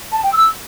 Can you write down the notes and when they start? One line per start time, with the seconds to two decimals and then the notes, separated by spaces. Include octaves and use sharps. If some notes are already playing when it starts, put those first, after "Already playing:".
0.12 A5
0.21 G5
0.31 E6